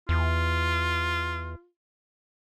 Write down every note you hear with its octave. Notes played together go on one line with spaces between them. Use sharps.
E2 F4